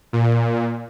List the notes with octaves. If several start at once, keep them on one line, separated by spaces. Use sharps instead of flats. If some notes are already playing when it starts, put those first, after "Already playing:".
A#2